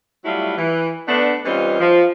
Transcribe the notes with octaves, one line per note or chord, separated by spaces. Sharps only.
F#3 G3 A3 E4 F4
E3
A3 B3 D4
E3 G3 C4 C#4 D#4 F4
F3